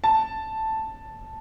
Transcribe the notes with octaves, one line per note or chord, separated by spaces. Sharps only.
A5